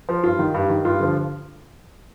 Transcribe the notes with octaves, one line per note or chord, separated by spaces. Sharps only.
F3
G2 F4
D#3
G2
D#3
G2 F4
D3 F3